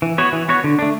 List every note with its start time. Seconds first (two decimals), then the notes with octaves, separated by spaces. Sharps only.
0.02 E3
0.18 B3 F#4 C#5
0.32 E3
0.48 B3 F#4 C#5
0.64 D3
0.79 A3 D4